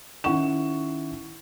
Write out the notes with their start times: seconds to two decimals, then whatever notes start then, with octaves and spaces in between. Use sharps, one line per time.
0.24 D#3 C#4 E4 F#5 C#6 E7